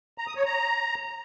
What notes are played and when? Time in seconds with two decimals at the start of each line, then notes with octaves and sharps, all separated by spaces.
0.18 A#5
0.27 D#6
0.36 C#5
0.45 A#5